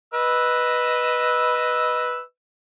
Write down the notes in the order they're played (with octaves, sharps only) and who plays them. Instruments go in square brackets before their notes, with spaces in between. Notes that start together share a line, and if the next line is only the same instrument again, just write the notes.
[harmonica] B4 D#5 E6